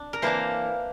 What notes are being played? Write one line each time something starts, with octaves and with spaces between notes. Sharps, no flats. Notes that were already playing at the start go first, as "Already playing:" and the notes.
Already playing: D4
A#4
E3 A#3 D4 C5